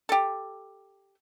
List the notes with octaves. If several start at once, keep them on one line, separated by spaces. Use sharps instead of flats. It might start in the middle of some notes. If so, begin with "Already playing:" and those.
G4 A4